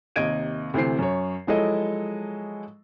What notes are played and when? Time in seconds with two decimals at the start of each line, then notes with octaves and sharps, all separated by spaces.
0.16 D#2 C3 D#5 G#6 D7 D#7
0.74 D2 C3 E3 C5 C7
0.99 F#2 C#5
1.47 F3 F#3 G#3 E4 A4 D#5